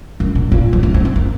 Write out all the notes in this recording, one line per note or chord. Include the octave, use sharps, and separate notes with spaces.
F#2
A#2
A#2
F3
A#3
C4
C4
A#3